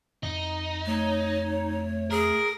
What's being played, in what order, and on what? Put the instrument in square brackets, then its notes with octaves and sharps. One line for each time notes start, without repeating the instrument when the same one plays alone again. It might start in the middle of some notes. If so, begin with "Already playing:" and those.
[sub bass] F2 [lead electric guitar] D#4
[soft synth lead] A3 [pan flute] C#5
[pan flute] G#4 [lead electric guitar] A#4